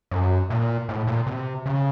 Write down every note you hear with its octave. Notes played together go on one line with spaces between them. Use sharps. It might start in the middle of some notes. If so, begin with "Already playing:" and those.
F#2
A#2
A2
A#2
C3
C#3